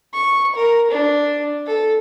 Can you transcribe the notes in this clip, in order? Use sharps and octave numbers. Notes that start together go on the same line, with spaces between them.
C#6
A#4
D4
A4